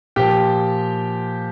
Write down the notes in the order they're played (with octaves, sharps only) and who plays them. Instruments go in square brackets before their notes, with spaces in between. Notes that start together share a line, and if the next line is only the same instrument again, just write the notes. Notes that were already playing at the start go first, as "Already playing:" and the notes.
[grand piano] A#2 F3 G4 G5